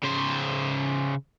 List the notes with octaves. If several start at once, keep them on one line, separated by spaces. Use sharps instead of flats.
C#3 C5